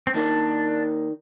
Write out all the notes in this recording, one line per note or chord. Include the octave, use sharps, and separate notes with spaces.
C4
D#3 A#3 D4 D#4 A#4 D5